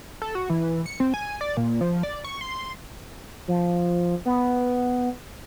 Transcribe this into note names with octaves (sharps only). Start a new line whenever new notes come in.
A4
F#4
E3
C#7
C4
G#5
D5
A#2
F3
D5
C#6
C6
F3
B3